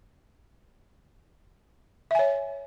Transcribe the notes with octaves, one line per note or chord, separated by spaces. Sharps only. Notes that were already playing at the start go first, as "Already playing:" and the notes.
C#5 E5 G#5